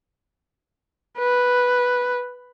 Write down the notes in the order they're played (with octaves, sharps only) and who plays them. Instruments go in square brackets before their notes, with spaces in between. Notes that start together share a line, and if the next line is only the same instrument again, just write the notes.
[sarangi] B4